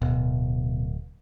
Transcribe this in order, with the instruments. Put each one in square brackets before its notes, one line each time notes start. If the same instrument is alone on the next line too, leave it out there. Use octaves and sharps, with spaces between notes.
[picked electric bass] D1 [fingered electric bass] B2